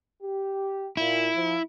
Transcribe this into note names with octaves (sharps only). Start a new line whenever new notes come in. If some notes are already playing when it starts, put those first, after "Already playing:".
G4
A#2 E4 F4
F3